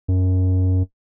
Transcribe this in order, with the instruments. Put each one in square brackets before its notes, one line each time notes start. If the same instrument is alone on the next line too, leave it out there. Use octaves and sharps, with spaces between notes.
[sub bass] F#2